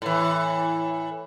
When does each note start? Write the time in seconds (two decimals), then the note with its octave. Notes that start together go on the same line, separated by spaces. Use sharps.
0.02 A2 E3